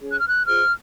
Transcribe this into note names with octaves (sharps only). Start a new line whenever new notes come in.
C#4 G#4 C#5
F#6
F6
F#6
F4 G#4 C5 F6